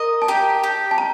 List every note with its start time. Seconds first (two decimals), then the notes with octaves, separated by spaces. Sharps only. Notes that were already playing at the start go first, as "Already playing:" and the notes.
Already playing: A#4 D#5
0.22 A5
0.28 G4 A#5
0.64 G4
0.91 A5
0.98 A#5